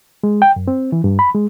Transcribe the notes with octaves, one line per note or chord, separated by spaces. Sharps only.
G#3
G5
F#2
C4
E3
G2
B5
G#3